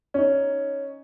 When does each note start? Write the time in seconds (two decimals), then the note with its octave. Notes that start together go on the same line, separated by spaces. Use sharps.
0.14 C#4 D#4